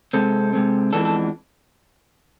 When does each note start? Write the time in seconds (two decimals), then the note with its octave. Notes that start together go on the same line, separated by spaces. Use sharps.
0.13 C3 G#3 C4 A4
0.53 C3 G#3 C4
0.93 F2 E3 G#3 B3 D4 A4
1.05 A4